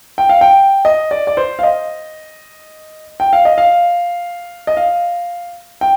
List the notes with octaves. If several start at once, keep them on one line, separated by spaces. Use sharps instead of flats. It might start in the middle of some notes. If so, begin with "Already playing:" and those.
G5
F5
G5
D#5
D5
D5
C5
F5
D#5
G5
F5
D#5
F5
D#5
F5
G5